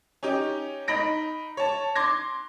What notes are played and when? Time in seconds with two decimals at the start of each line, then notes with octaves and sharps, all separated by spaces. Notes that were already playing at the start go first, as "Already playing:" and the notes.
0.23 C#4 D#4 G4
0.88 D#4 B5 A#6 D7
1.57 C#5 A5
1.96 C6 D6 G#6 A#6